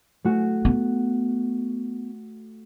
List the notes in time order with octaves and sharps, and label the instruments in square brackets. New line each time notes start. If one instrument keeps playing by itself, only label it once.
[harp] A3 F#4
[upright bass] B3